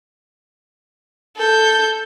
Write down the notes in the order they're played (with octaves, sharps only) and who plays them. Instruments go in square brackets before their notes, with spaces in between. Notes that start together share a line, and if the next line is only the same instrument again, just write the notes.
[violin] A4 G6